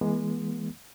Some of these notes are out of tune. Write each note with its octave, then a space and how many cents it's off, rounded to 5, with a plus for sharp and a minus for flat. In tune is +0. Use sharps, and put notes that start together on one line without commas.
E3 +0 G#3 +0 B3 -45